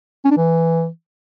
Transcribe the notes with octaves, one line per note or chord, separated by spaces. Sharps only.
C#4
D4
E3